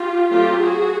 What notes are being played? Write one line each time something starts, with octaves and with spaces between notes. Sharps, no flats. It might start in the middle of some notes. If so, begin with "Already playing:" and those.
Already playing: F4 G4
F#3 A3 C4 F4 G4
F#4 G#4